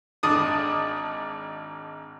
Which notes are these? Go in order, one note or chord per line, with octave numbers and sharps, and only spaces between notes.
G#1 D4 D#6